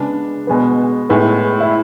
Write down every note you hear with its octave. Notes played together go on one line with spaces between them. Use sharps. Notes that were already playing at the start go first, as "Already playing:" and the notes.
Already playing: C#3 G#3 B3 D4
B2 G#3 B3
A2 G#3 B3
E4